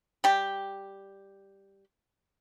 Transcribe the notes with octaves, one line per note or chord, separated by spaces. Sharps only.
G3 G4